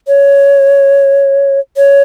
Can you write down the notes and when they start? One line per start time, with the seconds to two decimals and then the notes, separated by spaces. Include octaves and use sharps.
0.08 C#5
1.77 C#5